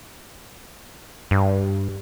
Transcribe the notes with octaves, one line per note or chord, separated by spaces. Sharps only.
G2